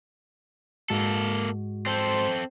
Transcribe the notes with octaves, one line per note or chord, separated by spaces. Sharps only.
G#2 G#3 A#3 F#4 A4
C4 A4 C5